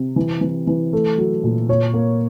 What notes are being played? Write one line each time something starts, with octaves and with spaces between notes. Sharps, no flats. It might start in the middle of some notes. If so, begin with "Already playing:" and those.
Already playing: C3
E3
E3
E3
A3
F#3
A#2
A#2 C#5
A#3